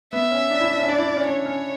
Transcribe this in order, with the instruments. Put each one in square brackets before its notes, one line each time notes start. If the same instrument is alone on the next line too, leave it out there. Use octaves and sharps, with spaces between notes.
[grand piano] B3 [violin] E5
[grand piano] C#4
D4
E4
D4
C#4
[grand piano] D4 [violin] D5
[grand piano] E4
D4
C#4
[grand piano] D4 [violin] C#5
[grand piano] C#4